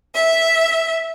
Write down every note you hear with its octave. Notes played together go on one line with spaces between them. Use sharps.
E5